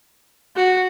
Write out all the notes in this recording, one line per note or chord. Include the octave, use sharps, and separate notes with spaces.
F#4